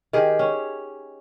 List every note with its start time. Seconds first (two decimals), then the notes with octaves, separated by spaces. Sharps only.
0.13 D#3 G4 G#4
0.39 C#4